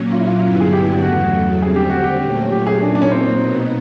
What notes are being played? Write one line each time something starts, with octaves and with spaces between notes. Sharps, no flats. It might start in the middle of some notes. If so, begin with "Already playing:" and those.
Already playing: A#2 F#3 A#3 C#4
F4
E4
F4
G2 D3 F#3 B3 E4
G#4
G4
E2 C#3 F#3 A3 F#4
D3 G3 C4 G#4
G4
F#4
G4
A#2 F#3 A3 C#4
G4
G#4
A#2 F#3 A#3 D4 D#4
D4
C#4
C4
B2 F#3 B3 D#4